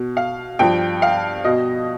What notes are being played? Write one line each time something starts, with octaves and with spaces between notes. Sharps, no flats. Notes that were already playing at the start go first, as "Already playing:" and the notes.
Already playing: B2
F5
G2 F3 G5
F5
B2 D#5